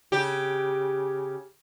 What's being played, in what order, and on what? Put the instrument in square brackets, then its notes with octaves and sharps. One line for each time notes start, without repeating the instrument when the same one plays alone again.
[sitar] C#3 G4